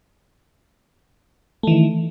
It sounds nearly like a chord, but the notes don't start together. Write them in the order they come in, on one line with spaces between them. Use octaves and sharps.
A3 E3 D#3